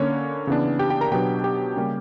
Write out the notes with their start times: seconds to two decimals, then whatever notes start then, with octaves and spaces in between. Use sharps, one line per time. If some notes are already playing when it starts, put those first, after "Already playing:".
Already playing: D3 A#3 C#4 C#5
0.47 C#3 E3 B3 D4
0.79 G4 G5
0.90 G4 G5
1.01 A#4 A#5
1.12 B2 F#3 B3 D4 G4 G5
1.44 G4 G5
1.76 C#3 G3 A#3 C#4